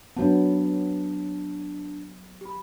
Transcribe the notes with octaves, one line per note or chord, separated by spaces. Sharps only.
F#3 B3 D4 A5
G4 B5